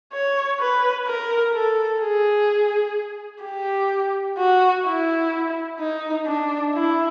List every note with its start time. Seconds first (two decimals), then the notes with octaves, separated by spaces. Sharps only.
0.13 C#5
0.60 B4
1.07 A#4
1.54 A4
2.01 G#4
3.43 G4
4.37 F#4
4.85 E4
5.80 D#4
6.26 D4
6.74 E4